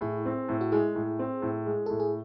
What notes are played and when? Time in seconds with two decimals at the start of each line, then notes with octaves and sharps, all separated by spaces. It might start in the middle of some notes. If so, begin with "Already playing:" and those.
0.01 A2 E4 G#4
0.26 C4
0.48 A2
0.61 F#4
0.72 G#3 E4 G#4
0.95 A2
1.19 C4
1.42 A2
1.66 G#3
1.86 A2 A4
2.00 G#4